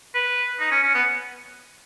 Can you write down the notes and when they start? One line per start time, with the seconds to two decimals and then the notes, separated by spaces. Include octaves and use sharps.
0.15 B4
0.60 D#4
0.71 C#4
0.83 C#4
0.94 B3